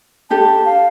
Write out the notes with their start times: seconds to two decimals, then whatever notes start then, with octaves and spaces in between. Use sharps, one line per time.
0.30 D4 G4 A4 A5
0.66 F5